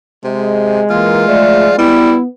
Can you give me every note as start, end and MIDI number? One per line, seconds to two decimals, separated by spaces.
0.24 0.82 48
0.24 1.98 56
0.90 1.25 52
0.90 1.25 58
0.90 1.78 65
1.28 1.74 53
1.28 1.69 57
1.28 1.74 68
1.28 1.74 74
1.78 2.14 55
1.78 2.24 59
1.78 2.18 64